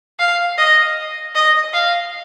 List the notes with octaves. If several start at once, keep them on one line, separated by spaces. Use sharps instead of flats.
F5
D#5
D#5
F5